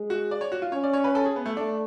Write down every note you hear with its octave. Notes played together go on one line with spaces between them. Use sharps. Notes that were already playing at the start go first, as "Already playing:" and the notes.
Already playing: G#3
F#4
D5
C#5
F#4
F4
C#4 C#5
D5
C#5
B4
A4
G#4
B3
A3
A3 D4